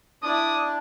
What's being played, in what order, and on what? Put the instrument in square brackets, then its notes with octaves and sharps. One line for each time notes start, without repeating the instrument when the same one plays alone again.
[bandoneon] D4 [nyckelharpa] E4 D5 [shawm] D#6